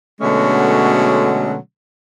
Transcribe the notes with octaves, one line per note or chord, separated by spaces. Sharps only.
B2 D3 F#3 G#3 A3 C#4